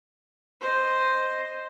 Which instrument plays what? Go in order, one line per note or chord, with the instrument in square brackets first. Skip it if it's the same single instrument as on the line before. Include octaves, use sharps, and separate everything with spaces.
[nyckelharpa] C5 D#5